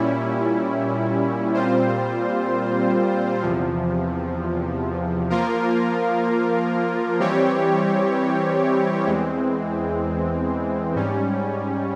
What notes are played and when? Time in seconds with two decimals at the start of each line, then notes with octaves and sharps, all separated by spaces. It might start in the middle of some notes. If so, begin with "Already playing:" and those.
Already playing: A#2 G3 C#4 E4
1.54 A#2 G3 C4 F4 C5
3.42 E2 C3 F3
5.30 F3 A#3 F4 A#4
7.19 E3 G3 C4 G4 C#5
9.06 E2 E3 G#3 C4
10.96 G#2 G3 C#4